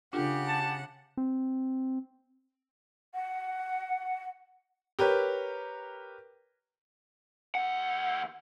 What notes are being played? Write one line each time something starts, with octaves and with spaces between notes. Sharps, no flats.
C#3 D4 F4 G4 A4 F#5
A5
C4
F#5
G4 A#4 B4 C#5
D#2 F#5